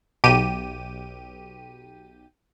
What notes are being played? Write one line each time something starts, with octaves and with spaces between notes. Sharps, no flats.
B1 G4 D#7